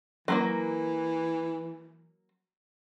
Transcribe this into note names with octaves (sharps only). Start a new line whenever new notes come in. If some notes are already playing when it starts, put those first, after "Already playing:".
E3 F#3 G#3 A#3